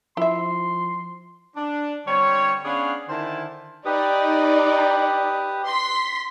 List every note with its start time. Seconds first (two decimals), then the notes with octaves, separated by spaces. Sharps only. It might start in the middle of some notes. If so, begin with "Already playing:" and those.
0.17 F3 E4 E5 C6
1.56 D4
2.07 D3 G3 C4 C#5
2.64 B3 C#4 D4 G#4 C#5 F5
3.09 D3 D#3 E4 C5 G#5 A5
3.85 D#4 G4 B4 D5 D#6
5.67 C6 B6